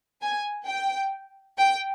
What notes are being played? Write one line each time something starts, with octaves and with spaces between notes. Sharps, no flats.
G#5
G5
G5